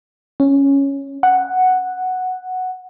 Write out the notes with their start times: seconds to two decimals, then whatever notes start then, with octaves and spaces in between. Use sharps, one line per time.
0.40 C#4
1.23 F#5